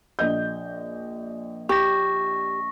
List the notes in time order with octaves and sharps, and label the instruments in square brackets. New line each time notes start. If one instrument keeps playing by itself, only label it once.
[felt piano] A#1 D#5 G6
[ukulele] G4 [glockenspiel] C#6 A#6